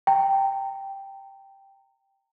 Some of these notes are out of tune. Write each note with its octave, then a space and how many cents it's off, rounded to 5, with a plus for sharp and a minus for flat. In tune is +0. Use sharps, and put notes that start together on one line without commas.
G5 +0 A#5 -35